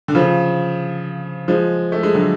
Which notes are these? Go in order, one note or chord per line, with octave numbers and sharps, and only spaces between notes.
D3
C#3 F3
F3 G#3
A3
G#3
D3 F#3